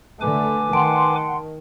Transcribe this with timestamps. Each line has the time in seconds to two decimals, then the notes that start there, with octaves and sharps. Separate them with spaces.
0.21 D3 A3 B4 G#5 D6
0.73 D#3 F#5 G5 A5 C6 D7